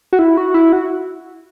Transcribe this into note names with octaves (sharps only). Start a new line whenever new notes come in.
F#4
E4
F#4
E4
F#4